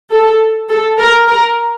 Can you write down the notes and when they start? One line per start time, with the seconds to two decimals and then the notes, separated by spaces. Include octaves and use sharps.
0.11 A4
0.69 A4
0.98 A#4
1.27 A#4